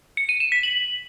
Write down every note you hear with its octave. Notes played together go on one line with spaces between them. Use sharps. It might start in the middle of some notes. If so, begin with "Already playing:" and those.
C#7
D#7
E7
B6
F#7